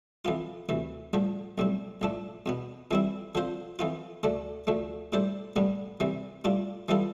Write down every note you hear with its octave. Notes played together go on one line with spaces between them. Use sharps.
F2 E3 B3 F4
D2 C3 E3
A1 G2 D3 F3
B1 A2 G3 C4
A1 A2 F3 A3 D4
E2 B2 B3
F2 E3 G3 C4 E4
D3 F3 C4 F4 C5
F2 E3 B3 F4
D2 D3 A3 D4 A4
D2 D3 F3 A3
A2 G3 D4 A4 C5
A1 G2 D3 G3 B3
C2 C3 E3 G3
A2 G3 D4 F4
E3 G3 B3 F4 A4